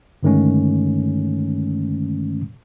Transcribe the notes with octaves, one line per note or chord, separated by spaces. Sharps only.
G2 D3 D#3 G#3 A3 C#4